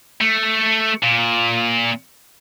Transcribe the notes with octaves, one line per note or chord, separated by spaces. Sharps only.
A3
A#2